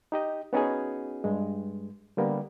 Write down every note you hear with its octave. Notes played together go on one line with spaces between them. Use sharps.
D#4 G4 D#5
B3 C#4 D#4 F#4 G#4
G2 G#3
D3 G3 A#3 B3